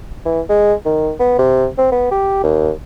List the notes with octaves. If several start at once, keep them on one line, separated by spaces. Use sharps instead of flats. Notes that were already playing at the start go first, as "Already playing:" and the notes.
E3
G#3
D#3
B3
C3
C4
B3
G4
D#2